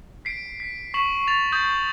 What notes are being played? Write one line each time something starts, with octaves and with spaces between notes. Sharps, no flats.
B6 C7 D7
B6
C#6 B6 C7 E7 F#7
A6 F7
D#6 G6 A6 F#7